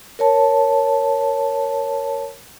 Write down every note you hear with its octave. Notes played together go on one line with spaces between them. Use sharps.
A#4 C#5 A5